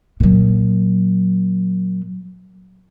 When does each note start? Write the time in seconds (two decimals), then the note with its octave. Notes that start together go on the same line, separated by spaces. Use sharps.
0.20 A#2 F#3